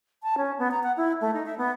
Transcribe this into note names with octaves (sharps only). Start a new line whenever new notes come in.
A5
C#4
B3
A#5
F#5
E4
A3
D#4
E5
B3